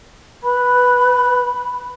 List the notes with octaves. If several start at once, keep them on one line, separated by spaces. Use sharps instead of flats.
B4 B5